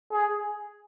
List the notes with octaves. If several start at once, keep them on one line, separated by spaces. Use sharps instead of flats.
G#4